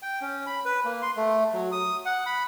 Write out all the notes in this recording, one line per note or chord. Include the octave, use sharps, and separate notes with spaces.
G5
C#4
B5
B4
A#3
C6
A3
F#3
D#6
F#5
B5